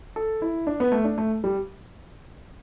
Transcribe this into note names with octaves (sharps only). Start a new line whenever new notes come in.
A4
E4
D4
B3
A3
D4
A3
G3